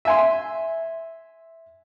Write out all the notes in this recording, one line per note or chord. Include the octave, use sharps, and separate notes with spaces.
E5 G#5 C6